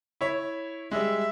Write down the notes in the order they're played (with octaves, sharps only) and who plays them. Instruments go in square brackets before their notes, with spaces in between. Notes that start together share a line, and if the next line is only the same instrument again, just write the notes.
[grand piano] E4 C#5
[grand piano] G3 G#3 [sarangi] E5